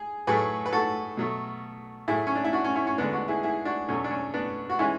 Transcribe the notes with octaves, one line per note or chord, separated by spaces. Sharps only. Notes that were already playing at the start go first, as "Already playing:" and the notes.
Already playing: G#4
A2 F#3 A3 G#4 B4
B4
F#4 A4
B2 F#3 A3
A2 F#3 A3 E4 G#4
C#4
D4
E4
D4 F#4
C#4
C#4 E4
C#4
E2 D3 G#3 B3 D4
D4 F#4
E4 G#4
E4 G#4
D4 F#4
E2 B2 F#3 A3 C#4
D4
C#4
B3 D4
F#4
E3 G#3 C#4 E4